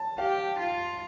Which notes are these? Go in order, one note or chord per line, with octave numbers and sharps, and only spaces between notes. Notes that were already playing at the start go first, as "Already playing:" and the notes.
Already playing: A5
G4 F5
F4